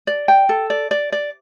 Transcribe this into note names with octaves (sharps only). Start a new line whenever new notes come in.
D5
G5
A4
D5
D5
D5